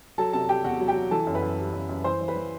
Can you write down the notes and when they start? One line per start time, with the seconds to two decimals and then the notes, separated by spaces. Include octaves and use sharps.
0.18 F#3 A4 A5
0.33 C3 A4 A5
0.49 F#3 G4 G5
0.64 E2 F#4 F#5
0.80 F#3
0.88 G4 G5
0.96 F#3
1.11 E3 A4 A5
1.27 F#2
1.35 B4 B5
1.42 F#2
1.58 G3
1.74 F#2
1.89 F#2
2.04 E3 C5 C6
2.21 E3
2.28 B4 B5
2.36 E3